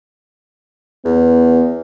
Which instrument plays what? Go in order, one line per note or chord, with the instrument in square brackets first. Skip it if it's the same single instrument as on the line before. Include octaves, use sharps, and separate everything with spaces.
[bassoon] E2 [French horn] B3